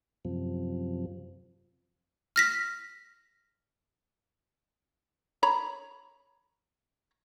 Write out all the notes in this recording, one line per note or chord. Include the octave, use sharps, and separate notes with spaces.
F#2 C3 F3
F6 A#6 B6
C#5 A#5 B5